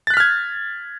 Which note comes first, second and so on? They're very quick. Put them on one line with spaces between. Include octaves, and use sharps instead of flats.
A6 F#6 B6 F6 G#6